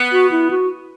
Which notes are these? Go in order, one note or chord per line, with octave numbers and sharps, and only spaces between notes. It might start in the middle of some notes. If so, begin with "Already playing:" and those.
Already playing: B3
F#4
E4
F#4